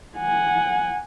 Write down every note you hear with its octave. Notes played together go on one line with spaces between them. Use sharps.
F#5 G#5